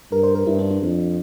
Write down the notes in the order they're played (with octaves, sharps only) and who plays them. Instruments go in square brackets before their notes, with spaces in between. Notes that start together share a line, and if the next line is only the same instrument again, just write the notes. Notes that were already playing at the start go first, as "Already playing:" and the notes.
[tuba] G2 [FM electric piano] A#4
[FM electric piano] C5
A#4
[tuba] G2 [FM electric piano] E4
[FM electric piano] D4
D4
[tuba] F2